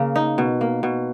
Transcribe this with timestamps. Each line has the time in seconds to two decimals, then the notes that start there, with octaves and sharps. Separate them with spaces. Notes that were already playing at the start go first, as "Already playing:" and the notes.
Already playing: C#3 A#3
0.16 D#4
0.38 B2
0.61 A#3
0.83 B2